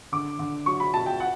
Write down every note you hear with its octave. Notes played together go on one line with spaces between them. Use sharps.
D3 D6
D3
F#3 C#6
B5
B2 A5
G5
F#5